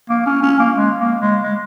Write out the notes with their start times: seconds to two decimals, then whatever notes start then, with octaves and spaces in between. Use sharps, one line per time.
0.10 A#3
0.26 C#4
0.43 C#4
0.59 A#3
0.76 G#3
0.98 A#3
1.21 G#3
1.43 G#3